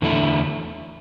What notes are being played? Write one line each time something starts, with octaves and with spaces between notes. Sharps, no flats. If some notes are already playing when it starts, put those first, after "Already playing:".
E2 D3 A3 E4